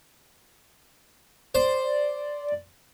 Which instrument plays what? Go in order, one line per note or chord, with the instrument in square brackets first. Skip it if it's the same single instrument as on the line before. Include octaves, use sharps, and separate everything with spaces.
[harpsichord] C5 [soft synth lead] D5